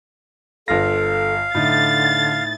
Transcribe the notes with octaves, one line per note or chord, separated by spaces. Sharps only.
G1 F4 A4 F5 A#6
A2 D3 D#4 A6